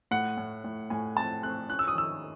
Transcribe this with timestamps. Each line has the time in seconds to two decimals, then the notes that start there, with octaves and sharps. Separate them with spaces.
0.11 A2 F#5
0.37 A2
0.64 A2
0.90 A2 G#5
1.17 C4 A5
1.43 C4 F#6
1.69 C#4 F#6
1.79 E6
1.88 D#6
1.95 D#3 E6